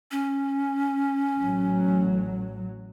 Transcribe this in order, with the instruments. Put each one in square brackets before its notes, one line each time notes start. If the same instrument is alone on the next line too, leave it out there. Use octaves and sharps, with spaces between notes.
[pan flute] C#4
[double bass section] A1 A2 F#3